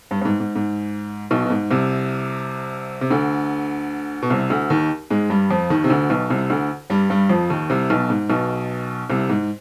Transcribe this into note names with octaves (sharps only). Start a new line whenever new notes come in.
G2
G2
G#2
G#2
G#2
B1 B2
B2
G#2
C2 C3
C3
D2 D3
B2
C2 C3
D2 D3
D#2 D#3
G#2 G#3
G2 G3
F2 F3
D#2 D#3
C3
D2 D3
B1 B2
C2 C3
D2 D3
G2 G3
G2 G3
F2 F3
D#2 D#3
C2 C3
B1 B2
G#2
B1 B2
C2 C3
G#2